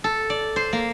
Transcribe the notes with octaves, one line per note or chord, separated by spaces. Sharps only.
A4
D5
C5
A#3